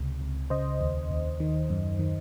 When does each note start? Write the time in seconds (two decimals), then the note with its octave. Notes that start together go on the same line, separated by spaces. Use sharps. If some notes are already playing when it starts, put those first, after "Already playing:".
Already playing: C#2 C3
0.21 C#2
0.50 C#3 C5 D#5
0.81 D#2
1.10 D#2
1.40 D#3
1.70 F#2
1.99 D#3